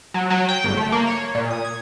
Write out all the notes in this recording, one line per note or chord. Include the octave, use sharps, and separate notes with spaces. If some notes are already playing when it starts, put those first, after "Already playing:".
F#3
F#3
G5
G1
A3
A#3
C#5
A#2
D#6
G#6